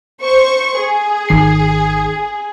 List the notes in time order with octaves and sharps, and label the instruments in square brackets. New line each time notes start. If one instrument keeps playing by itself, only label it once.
[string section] C5 C#6
G#4
[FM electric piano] G#1 D#3 C7